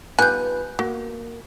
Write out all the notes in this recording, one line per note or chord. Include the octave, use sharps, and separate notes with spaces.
G3 B3 D#4 F4 B4 G#5 F#6 G6
A#3 F#4